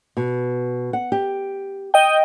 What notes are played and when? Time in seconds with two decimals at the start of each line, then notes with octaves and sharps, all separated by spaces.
0.17 B2
0.93 F#5
1.12 G4
1.94 D#5 G5